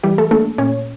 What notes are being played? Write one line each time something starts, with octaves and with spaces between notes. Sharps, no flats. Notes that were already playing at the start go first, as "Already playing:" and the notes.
E3 G3 G4
A3 A4
A3 A#3 D4 A4
A#2 C#4 C#5